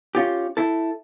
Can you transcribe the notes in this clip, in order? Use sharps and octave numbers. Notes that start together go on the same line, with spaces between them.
C#4 F4 G4
E4 A4